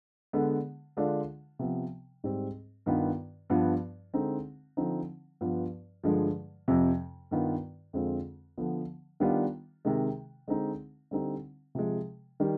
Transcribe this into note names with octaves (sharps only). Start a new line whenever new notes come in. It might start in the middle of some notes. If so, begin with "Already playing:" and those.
D3 G#3 B3
D3 G#3 D4 F4
C3 F3 B3
G#2 G3 C4
G2 D#3 B3 F4
G2 F3 B3 F4
D3 G#3 C4 D#4
D3 F3 C4 D#4
G2 F3 B3 F4
G2 D3 F3 G#3
F2 C3 F3
G2 D#3 B3 F4
F2 D3 G#3 C4 F4
D3 F3 B3
D#3 G3 B3 D4 F4
C3 D#3 G#3
D3 G#3 C4 D#4
D3 G3 C4 D#4
C3 F3 G#3
D#3 G3